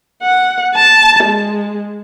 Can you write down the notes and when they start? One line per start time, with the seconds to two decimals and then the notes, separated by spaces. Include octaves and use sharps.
0.23 F#5
0.76 A5
1.24 G#3